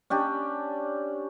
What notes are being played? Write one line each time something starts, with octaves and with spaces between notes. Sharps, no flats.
C#4 D4 G4